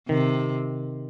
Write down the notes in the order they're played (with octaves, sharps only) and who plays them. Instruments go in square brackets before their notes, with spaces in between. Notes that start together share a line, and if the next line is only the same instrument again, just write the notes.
[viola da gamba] C3 [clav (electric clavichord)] D#3